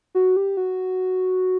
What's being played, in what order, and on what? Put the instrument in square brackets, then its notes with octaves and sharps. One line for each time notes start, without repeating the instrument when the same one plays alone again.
[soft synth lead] F#4
G4
F#4